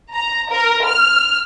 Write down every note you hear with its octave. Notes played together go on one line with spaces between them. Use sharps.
A#5
A#4
F6